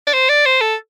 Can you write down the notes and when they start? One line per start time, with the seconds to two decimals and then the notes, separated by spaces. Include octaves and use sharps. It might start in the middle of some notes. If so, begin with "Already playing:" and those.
0.07 D5
0.13 C5
0.29 D5
0.46 C5
0.61 A4